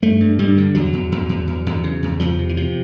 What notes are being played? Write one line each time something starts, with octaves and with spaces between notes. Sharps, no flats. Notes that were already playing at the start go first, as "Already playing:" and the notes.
G2 A3
G2
G2 G3
D3
E2 F#3
E2
E2
E2
E2
E2
C#3
E2
E2 F3
C3
E3
C3 F3